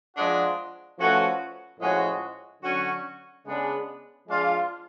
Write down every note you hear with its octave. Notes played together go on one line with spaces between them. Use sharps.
F3 G#3 D4 F#4
F3 A3 C#4 F#4 B4
A2 F3 G#3 C#4 F#4
D3 F#3 C#4 F#4
C#3 G#3 B3 D4 G#4
F3 G#3 D4 F4